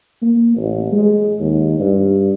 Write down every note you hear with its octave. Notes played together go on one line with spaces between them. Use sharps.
A#3
A1
G#3
D#2
G2